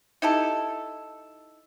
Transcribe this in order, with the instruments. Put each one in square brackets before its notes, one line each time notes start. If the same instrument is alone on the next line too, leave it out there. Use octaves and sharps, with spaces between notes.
[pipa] D#4 E4 G4 A4